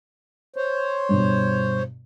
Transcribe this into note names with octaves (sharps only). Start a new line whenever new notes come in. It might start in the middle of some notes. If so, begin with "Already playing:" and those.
C5 C#5
G2 B2